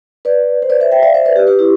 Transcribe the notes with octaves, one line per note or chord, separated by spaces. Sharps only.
B4 D5
C5
B4 D5
C5 E5
E5 G5
D5 F5
C5 E5
B4 D5
G4 B4
G4 B4
E4 G4